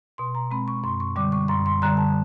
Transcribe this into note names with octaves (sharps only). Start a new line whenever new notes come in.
B2 C6
A#5
G#3 C4 B5
C#6
F#2 C6
C#6
D3 G3 D6
C#6
F#2 C6
C6
D3 G3 A#5
A5